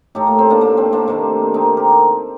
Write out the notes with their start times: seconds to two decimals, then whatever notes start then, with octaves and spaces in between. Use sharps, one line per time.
0.15 A2 A3 D#4 G4
0.27 A#3
0.39 C4
0.50 A#3 D4
0.61 A#3
0.77 C4
0.92 A#3 D4
1.08 C3 D#3 A3
1.54 C4 D#4
1.77 G4 A#4